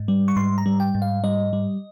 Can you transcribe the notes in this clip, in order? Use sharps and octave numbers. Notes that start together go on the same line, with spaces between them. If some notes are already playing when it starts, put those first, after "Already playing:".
Already playing: G#2
G3
C#6
G#2 C6
A#5
G3
G5
G#2
F5
G3 D#5
G3